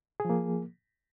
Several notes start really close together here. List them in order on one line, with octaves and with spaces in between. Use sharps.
G#4 F3 A#3